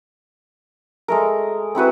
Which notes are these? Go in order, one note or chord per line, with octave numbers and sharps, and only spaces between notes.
G#3 A3 A#4
C4 E4 F#4 B4